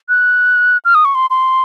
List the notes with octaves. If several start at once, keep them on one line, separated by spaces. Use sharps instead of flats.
F#6
F6
D#6
C#6
C6
C6